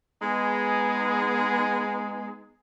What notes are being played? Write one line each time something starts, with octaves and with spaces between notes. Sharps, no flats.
G#3 B3 D#4 G#4